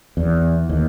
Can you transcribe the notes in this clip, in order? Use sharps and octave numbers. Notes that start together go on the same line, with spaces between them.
E2
D#2